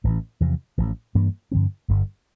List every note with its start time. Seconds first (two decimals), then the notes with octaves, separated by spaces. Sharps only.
0.04 A1 A2 E3
0.40 E2 C3 F3
0.78 A1 A2 F3
1.15 G2 E3 A#3 D4
1.52 G2 D3 F3 C4
1.88 G1 G2 D3 G3